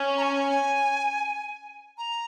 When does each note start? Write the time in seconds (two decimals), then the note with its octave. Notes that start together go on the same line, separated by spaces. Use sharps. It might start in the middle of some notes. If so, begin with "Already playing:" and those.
Already playing: C#4
0.17 A#5
0.23 G#5
1.98 A#5